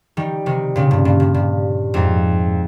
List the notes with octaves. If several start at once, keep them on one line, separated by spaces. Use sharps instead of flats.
D#3 G3
C3 D#3
A#2 C#3
G2
G2
G2
G2
F2 G#2